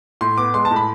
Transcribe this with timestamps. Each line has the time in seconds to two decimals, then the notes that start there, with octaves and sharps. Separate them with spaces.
0.21 A2 C6
0.37 B3 D6
0.54 G#3 C6
0.65 A5
0.71 A2
0.76 B5